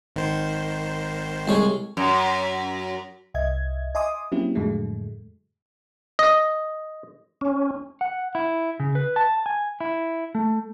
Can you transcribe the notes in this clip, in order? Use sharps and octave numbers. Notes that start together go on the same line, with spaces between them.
G#1 D#3 C5
C2 G#3 C#5
F#2
C2 D#5 E5 G#6
D#5 E5 G#5 C6 D6 D#6
F#3 A#3 C4 C#4 E4 G4
F2 A2 D3 F#3 G#3 A3
D#5
C#4
F#5
E4
C#3
B4
A5
G#5
E4
A3